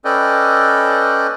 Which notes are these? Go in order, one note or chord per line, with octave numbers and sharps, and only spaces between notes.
C#4 A4 B4 D5 D#5 G5